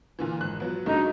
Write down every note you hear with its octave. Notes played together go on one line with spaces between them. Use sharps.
A#2 D3 E3
G#1 F#6
F3 F#3 B3
G2 C#3 A3 D4 D#4 F#4